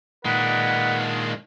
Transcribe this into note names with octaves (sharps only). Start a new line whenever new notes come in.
A#2 D#3 G#3 D4 B4 F#5